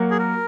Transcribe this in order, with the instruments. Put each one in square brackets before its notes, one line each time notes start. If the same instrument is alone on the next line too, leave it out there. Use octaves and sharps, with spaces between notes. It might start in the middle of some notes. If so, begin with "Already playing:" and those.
Already playing: [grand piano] F#3 A#3 F#4
[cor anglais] G#4
A#4